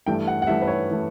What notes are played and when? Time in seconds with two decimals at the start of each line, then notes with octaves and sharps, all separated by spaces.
0.06 G2 E3 A3 G5
0.27 F#5
0.42 F#5
0.47 G2 E3 A3 E5
0.62 B4
0.68 C#5
0.91 E3 A3